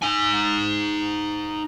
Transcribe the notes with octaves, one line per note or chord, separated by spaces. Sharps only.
D#4 G#5